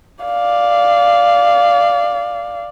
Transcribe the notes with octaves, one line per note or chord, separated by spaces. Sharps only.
D5 F5